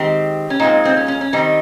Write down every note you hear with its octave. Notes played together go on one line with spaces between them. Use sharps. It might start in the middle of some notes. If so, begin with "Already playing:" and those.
Already playing: D#3 G#3 C4 G4
C#4
A#2 G#3 C4 D#4
C4
C#4
C#4
C#4
D#3 G3 C4 D#4